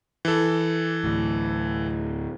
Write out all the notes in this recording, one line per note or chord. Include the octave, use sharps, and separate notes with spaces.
E3 A4
D2 A2